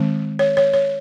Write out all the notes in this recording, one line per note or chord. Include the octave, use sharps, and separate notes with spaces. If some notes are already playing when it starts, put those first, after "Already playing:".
Already playing: D#3 G#3 C4
C#5
C#5
C#5